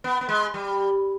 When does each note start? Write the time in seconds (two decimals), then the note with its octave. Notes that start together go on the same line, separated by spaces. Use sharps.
0.04 B3
0.21 B3
0.29 G#3
0.54 G3